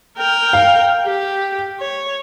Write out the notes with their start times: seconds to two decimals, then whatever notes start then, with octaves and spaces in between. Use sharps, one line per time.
0.18 A#4 G5
0.53 F5
1.06 G4
1.80 C#5